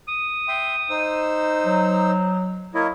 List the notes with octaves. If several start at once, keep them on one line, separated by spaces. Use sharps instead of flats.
D#6
E5 G5 C6
D#4 C5 E6
F#3
A#3 E4 C#5 D#5